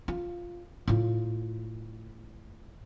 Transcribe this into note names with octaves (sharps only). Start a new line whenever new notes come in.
F4
A2 F4